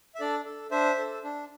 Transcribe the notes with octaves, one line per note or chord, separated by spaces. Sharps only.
E5
D4 A4 D5
A4
D4 C5 E5
A4
D4